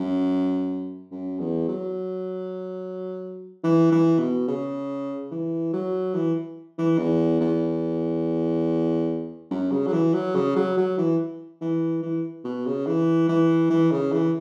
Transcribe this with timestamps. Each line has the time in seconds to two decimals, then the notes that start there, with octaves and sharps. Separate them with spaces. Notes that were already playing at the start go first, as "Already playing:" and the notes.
Already playing: F#2
1.12 F#2
1.39 E2
1.68 F#3
3.64 E3
3.92 E3
4.19 B2
4.48 C#3
5.31 E3
5.73 F#3
6.15 E3
6.78 E3
6.99 E2
7.41 E2
9.51 F#2
9.72 C#3
9.87 F#3
9.93 E3
10.14 F#3
10.35 C#3
10.56 F#3
10.77 F#3
10.98 E3
11.61 E3
12.03 E3
12.44 B2
12.66 C#3
12.87 E3
13.29 E3
13.70 E3
13.92 C#3
14.12 E3